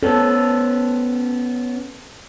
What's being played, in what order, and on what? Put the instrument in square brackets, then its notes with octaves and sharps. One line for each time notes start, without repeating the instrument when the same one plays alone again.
[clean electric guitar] B3 C#4 [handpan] A4